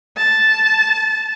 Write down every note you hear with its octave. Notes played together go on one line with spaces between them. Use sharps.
A5